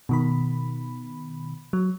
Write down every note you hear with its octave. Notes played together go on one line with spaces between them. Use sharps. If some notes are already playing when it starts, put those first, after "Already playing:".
B2 D#3 B5
F#3